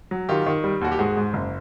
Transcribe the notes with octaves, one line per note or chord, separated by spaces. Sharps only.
F#3
D#3 F4 G4
D#3
G3
D#2 F#4
G4
G#2 F#4 G#4
G#2
F#1